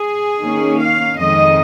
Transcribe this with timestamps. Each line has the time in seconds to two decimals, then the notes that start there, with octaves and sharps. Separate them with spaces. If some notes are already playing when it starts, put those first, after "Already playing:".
Already playing: G#4
0.39 D#3 A#3 C#4
0.78 F5
1.16 F2 D#3 G#3 D#5